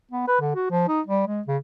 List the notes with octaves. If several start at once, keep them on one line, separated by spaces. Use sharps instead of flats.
B3
B4
D3
F#4
F3
D#4
G3
G#3
C#3